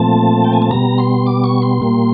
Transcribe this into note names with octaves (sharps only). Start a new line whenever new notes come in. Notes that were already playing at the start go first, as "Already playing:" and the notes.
Already playing: A#2 F3 A3 C4 A5
G5
G#5
A5
B2 G3 B3 A#5
C6
D6
C#6
C6
A#2 G3 A#3